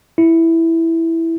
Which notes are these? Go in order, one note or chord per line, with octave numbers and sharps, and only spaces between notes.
E4